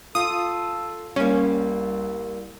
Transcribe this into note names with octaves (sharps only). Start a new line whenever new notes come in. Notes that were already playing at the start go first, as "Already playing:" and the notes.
F4 A4 D#6
C2 G3 A#3 C#4